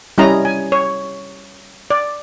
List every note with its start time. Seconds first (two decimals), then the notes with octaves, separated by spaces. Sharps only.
0.18 G3 C#4 E4 D#5 A#5
0.45 G#5
0.72 C#5
1.90 D5